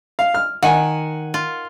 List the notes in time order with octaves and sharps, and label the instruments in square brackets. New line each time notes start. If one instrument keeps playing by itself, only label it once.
[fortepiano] F5
F6
[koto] D#3 [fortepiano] F#5 G#5
[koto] F4